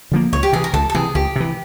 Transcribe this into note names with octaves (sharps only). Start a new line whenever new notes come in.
D3 F3 A#3
C#2 C#5
G4
C3 E3 G#4
A#4
C#2 A4
A4
C3 E3 G#4
C#2 G4
C3 E3